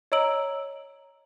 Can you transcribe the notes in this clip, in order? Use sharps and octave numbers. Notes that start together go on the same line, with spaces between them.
C#5 D#5 A#5 E6 D7 F#7